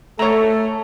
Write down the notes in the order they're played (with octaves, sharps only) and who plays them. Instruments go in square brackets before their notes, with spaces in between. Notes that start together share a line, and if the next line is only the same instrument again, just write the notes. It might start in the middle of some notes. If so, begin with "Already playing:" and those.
[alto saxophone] A3 [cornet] A4 [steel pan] C#5 A#5